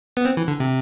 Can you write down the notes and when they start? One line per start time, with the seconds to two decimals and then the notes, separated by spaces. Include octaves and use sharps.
0.17 B3
0.25 C4
0.37 E3
0.48 D3
0.60 C3